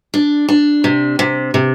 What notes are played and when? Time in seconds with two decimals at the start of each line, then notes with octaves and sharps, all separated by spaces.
0.14 D4
0.49 D4
0.84 C3
1.19 C3
1.54 C3